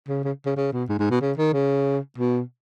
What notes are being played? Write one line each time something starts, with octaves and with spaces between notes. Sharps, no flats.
C#3
C#3
C#3
C#3
B2
G#2
G#2
B2
C#3
D#3
C#3
B2